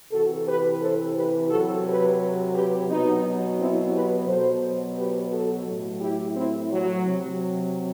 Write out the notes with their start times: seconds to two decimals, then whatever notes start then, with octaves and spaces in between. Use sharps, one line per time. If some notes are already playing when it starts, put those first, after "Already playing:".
0.12 C3 E3 F#4 A4
0.46 G4 B4
0.81 A4 C5
1.15 G4 B4
1.50 C3 F#3 F#4 A4
1.85 G4 B4
2.54 G4 B4
2.89 B2 F#3 B3 D#4
3.58 C4 E4
3.92 G4 B4
4.27 B2 F#3 A4 C5
4.96 G4 B4
5.31 F#4 A4
5.66 A2 F#3
6.00 E4 G4
6.35 C4 E4
6.70 F#3
7.04 C3 F#3